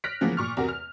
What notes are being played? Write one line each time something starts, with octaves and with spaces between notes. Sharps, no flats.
F6 F#6 A#6 B6 D7
C#3 E3 F3 G#3 A#3 B3
A#2 C#6 F6
E2 C3 F#4 A#4
F6